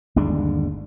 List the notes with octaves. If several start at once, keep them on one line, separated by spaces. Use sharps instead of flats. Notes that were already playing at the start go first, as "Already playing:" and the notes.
G1 D#2 G#3 D4